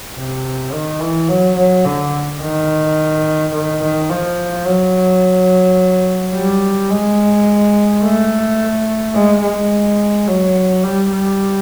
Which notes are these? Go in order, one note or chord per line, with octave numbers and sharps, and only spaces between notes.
C3
D#3
E3
F#3
F#3
D3
D#3
D#3
D#3
F3
F#3
G3
G#3
A3
G#3
G#3
F#3
G3
G3